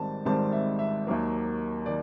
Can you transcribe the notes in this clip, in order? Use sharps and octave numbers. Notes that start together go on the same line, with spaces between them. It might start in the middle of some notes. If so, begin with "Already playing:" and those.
Already playing: G#1 G#2 D#3 G3 C4 A5
G#1 G#2 D#3 G3 C4 A5
E5
E5
D#2 D#3 F#3 A#3
D#3 D5